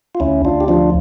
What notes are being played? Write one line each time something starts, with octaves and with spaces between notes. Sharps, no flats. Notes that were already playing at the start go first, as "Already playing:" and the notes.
F4
D2 C#4 E4
D2 D4 F4
G4
F3 D4 F4